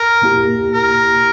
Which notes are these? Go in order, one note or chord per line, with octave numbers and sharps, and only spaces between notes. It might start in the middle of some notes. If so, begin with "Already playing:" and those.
Already playing: A#4
A#2 A#3 E4 G4
A#4